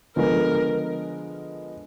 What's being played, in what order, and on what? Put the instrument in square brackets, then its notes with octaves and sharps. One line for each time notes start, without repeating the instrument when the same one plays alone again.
[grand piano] D3 F3 G#3 B3 [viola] A#4